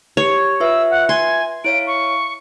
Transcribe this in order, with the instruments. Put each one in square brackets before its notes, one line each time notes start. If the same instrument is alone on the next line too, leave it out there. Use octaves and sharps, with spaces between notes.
[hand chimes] G4 [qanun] C#5
[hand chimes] F4 B4 E5 [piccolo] E6
[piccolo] F#5
[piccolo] G#5 [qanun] C6
[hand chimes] E4 C#5 F5 [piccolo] D7
[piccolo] C#6